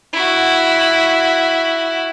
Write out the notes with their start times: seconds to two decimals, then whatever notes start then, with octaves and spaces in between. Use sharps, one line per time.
0.13 E4 F#4